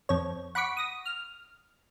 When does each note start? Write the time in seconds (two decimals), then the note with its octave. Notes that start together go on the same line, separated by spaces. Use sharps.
0.09 F2 C#5
0.55 F#5 B5 C#6 D6 B6
0.77 D#6 A#6
1.06 F6